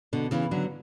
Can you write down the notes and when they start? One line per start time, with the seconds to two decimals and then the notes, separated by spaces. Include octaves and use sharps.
0.13 B2 D3
0.31 C#3 E3
0.51 D3 F#3